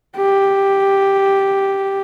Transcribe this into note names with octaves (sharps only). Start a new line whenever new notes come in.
G4